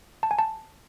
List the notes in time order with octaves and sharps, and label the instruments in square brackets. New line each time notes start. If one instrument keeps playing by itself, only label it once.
[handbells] A5
G#5
A5